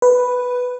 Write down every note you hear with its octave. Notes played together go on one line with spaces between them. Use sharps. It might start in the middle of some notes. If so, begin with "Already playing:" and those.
B4